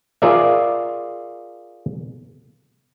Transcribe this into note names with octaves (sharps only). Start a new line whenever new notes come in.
F4 G#4 A#4 D5 E5